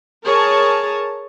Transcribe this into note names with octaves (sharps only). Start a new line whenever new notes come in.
G#4 A#4 C#5 A5